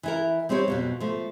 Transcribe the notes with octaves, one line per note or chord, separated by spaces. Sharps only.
E3 E4 A#4
G3 C4 D#4 G4 C#5
F2 B2 F#3
F3 A3